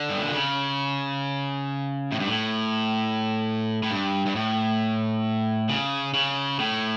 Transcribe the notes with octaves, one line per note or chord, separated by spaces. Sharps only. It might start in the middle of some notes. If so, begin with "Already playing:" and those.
Already playing: D3
G2
A2
A#2
C#3
A2
G2
A2
A2
G2
G2
A2
C#3
C#3
A2